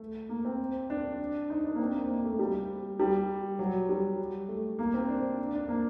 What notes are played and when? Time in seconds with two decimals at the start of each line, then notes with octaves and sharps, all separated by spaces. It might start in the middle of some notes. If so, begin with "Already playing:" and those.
Already playing: A3
0.29 A#3
0.45 C4
0.90 D4
1.50 D#4
1.64 D4
1.75 A#3
1.79 C4
1.94 A#3
2.09 A#3
2.24 A3
2.39 G3
3.00 G3
3.59 F#3
3.89 G3
4.48 A3
4.79 A#3
4.94 C4
5.08 D4
5.54 D4
5.69 A#3